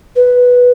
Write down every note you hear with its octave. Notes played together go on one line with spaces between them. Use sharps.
B4